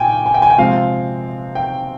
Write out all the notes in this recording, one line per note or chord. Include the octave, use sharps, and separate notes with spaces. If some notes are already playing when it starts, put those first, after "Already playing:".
Already playing: A#2 G5 G#5
G#5
G5
G#5
G5
C3 F3 G#3 C4 F5
G5